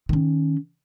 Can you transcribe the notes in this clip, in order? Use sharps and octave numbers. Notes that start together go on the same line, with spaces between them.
D#3 C#4